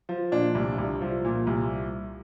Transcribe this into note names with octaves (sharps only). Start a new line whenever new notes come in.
F3
A#2 D4
C2
C2
F3
A#2
C2